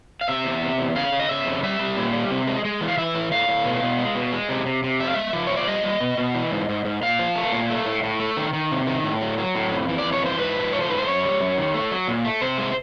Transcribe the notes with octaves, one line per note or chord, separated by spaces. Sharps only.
F5
C3 E5
E2
C3
E2
C#3 F5
C#3
D#5
C#3 E5
F2
G3 E5
G3
A#2
G3
C3
G#3
G#3
E3
F5
E3 E5
A2
A2 F5
A2
B2
B2
G#3
B2
G#3
C3
C3
C3
F2 E5
F5
G#3 E5
F3
F3 C#5
D5
G3 D#5
G3
B2
B2
E3
G#2
G#2
G#2
A#2 F5
F3
A3
A#2
A3
A2
A2
A3
D#3
D#3
C3
D#3
A2
F#3
F#3
A2
F2
E3
D5
F2
C#5
E3 C5
G#2 B4
F3
A3 C#5
C5
G#2 B4
C5
F#2 C#5
G3
F#2
D#3
A3
F#3
A#2
A3
C3 C5
G#3